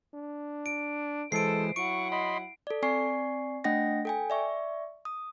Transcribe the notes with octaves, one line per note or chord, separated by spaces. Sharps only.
D4
D7
E3 G#3 A4 C5 C7 D7
F#3 E4 F#5 C#6 D7
D#5 B5 C6
A4 D5
C4 D5 G#5 C#6 C7
A3 D4 D#5 F#5 G5 A#6
A4 G5 G#5
D5 E5 C#6
D#6